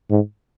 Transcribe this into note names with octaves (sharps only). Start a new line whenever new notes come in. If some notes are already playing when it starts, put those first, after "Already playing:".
G#2